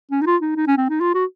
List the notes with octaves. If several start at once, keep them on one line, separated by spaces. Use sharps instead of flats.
C#4
D#4
F4
D#4
D#4
C#4
C4
D#4
F4
F#4